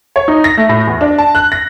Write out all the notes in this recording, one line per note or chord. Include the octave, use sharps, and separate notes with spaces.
C#5
D#4
A#6
A3
A2
E2
D4
A5
F#6
A#6